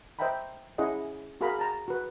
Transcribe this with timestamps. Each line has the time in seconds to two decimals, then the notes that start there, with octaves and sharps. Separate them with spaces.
0.19 C5 D#5 E5 G5 A#5 B5
0.78 C#4 E4 G#4 D#5 F#5
1.41 F#4 G#4 A#4 F5 A#5 B5
1.59 A5 A#5
1.88 F#4 B4